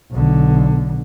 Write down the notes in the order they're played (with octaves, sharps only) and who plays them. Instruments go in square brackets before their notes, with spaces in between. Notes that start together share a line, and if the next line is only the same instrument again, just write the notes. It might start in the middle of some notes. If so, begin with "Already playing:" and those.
[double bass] B1 D3